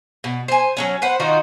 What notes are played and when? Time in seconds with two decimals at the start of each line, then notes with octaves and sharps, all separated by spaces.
0.24 B2
0.48 C5 G#5
0.77 F#3 B3 C#4
1.02 B4 C5 F#5
1.20 D#3 D#4 F4 F#4